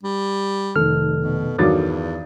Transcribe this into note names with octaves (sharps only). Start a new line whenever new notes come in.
G3
F1 D#3 A4 F6
B2
E2 G2 D#3 F#3 D6 A6